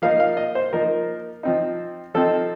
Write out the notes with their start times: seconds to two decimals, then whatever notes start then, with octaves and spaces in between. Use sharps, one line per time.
0.02 F3 A#3 D#4 F5
0.20 F5
0.37 D#5
0.55 C5
0.73 F3 A#3 D#4 A#4
1.43 F3 C4 D#4
2.14 F3 C4 D#4 A4